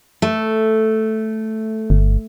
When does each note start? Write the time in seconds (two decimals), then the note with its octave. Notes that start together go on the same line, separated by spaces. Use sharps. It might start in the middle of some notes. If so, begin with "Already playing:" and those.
0.22 A3
1.90 G1